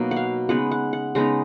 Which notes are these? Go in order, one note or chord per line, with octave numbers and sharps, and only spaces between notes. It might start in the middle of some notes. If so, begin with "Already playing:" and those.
Already playing: B2 F#3 A#3 D#4
F#5
F5
C#3 G#3 B3 D#4 F#5
F#5
F#5
C#3 G#3 B3 D#4 A#5